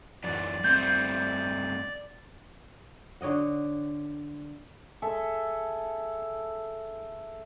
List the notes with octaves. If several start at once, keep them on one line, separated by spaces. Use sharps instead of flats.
F#2 E3 F#3 D5
G2 A3 C4 G6
D3 C#5 D#5 F#5
G#4 A4 E5